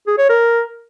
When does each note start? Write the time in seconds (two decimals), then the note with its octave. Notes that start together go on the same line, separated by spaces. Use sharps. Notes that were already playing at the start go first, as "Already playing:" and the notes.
0.07 G#4
0.18 C#5
0.29 A#4